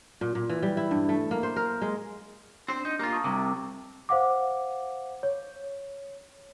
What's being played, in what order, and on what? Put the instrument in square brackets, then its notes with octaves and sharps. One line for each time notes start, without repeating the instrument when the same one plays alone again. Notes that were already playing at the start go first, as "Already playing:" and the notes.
[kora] A#2
A#2
E3
G3
E4
G2
A3
A#3
C5
A#4
G#3
[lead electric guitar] C4 C5 [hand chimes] D4
[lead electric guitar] D#4
[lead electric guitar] A#3 F4 [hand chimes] G4 A#5
[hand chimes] A5 C#6 D#6
[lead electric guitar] C2 C3 [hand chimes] D6
[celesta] C5 F5 F#5 D6
C#5